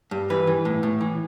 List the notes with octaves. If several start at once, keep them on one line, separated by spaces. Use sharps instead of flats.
G2
E3 B4
E3
A2
A2
E3